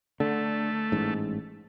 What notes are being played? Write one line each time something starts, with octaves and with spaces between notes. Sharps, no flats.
D3 A3
A1 G#2